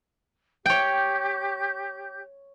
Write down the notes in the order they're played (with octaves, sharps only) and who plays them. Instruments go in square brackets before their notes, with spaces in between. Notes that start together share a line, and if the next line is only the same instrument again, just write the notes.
[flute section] G4 G6 [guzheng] C#5 G5